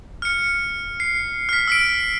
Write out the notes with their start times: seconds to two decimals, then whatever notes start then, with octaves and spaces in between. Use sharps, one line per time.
0.22 F6 C#7
1.00 C7
1.49 F6 B6
1.68 E6 B6 D7